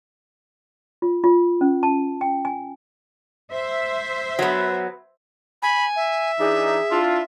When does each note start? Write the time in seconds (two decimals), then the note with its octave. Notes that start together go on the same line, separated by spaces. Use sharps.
1.02 F4
1.24 F4
1.61 C#4
1.83 A5
2.21 G5
2.45 G#5
3.52 C5 E5
4.39 F#3 B3
5.62 G#5 B5
5.96 E5
6.40 E3 D4 D#4 G#4
6.91 D4 E4 F4